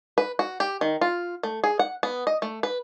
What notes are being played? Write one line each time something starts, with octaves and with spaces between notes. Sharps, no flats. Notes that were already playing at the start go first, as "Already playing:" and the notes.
B4
F#4
G4
D#3
F4
A3
G#4
F#5
B3
D#5
A3
B4